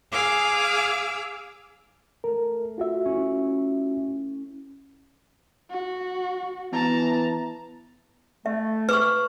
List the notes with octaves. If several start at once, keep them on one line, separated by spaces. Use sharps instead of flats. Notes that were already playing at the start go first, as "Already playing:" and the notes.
G#4 F5 D6 E6
A3 A#4
F4 F#4 E5
C#4 E4
F#4
E3 B3 A5 A#5
A3 E5
B4 C#6 D6 F6